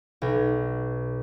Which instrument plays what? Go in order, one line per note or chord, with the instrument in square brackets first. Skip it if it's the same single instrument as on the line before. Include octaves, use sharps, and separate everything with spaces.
[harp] B1